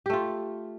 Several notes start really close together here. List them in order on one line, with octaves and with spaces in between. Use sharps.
G4 A3 F4